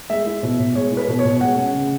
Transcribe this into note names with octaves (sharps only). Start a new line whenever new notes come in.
G#3 E5
E4
B2
B2
G#3 C#5
E4
B4
B2
C#5
B2
G#3 F#5
C#4
C#3